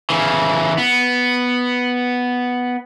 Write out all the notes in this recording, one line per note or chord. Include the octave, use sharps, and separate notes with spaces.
C#3 E3
B3